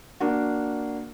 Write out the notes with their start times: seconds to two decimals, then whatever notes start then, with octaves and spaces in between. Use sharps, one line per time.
0.20 A#3 D4 F#4